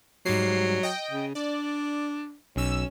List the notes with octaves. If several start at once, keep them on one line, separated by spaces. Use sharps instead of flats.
G#2 F#3 G3 C7
D#5 G5
C#3
D4 D5
B1 C#4 E6